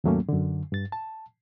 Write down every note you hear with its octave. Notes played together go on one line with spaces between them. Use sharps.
D#2 G#2 F#3 A3 A#3 C#4
F#2 D3
G2 A6
A5